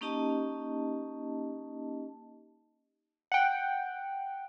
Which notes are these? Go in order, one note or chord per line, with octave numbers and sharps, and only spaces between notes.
A#3 C#4 D#4 G4 D#5 A5
F#5 G5